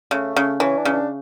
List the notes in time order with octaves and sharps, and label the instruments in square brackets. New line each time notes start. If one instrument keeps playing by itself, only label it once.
[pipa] C#3 [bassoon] A3
[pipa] C#3
[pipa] E3 [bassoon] C#4
[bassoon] D4
[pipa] C#3
[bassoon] D4